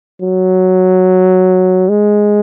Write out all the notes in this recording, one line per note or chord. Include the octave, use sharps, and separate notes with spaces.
F#3
G#3